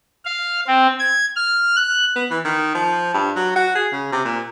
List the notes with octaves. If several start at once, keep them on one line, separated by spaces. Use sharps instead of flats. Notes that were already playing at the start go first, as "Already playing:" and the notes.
F5
C4
G#6
F6
F#6
B3
E3
D#3
F3
G2
F#3
F#4
G#4
C#3
C3
A#2